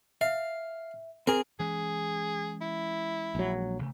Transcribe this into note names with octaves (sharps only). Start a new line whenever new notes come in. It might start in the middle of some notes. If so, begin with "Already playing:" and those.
E5 F5
C4 G#4 A#4
E3 G#3 C#4 G#4
E4
A#1 F#3
A1 C3 A3